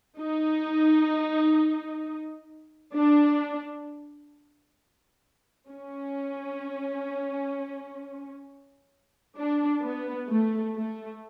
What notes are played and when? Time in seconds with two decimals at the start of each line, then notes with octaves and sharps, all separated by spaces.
0.19 D#4
2.94 D4
5.70 C#4
9.38 D4
9.83 B3
10.30 A3
10.76 A3